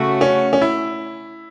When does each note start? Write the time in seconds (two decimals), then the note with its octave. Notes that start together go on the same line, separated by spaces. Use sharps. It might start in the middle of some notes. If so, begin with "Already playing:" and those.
Already playing: C#3 A3 F#4
0.21 C#4
0.53 C#4
0.62 E4